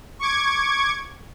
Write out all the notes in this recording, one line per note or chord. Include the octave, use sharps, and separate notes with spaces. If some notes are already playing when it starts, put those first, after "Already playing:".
C#6 D6 G#6